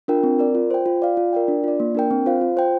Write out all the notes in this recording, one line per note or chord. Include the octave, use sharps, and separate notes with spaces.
D4 F4 A#4 G5
C4
A#4 D5
F4
C5 G5
F4
D5 F5
F4
A#4 D5 G5
D4
F4 D5
A#3
D4 A#4 G5
C4
F4 C5 F5
F4
C5 G5